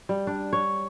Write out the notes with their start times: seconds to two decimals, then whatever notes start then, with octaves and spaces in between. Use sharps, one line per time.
0.09 G3
0.27 D4
0.53 C#5